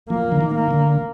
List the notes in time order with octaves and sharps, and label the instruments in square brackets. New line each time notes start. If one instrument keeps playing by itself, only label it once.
[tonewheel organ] F3 [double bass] A#3
[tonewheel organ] D3
D#3
[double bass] A#3
[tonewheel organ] D3